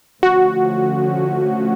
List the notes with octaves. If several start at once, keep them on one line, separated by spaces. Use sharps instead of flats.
D3 F3 A3 C#4 F#4